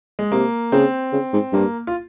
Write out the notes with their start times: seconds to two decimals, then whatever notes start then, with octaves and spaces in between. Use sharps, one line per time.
0.19 G#3
0.32 C3 A#3
0.72 C#3 C4
1.13 C#3
1.33 G#2
1.53 G2 A#3
1.87 F4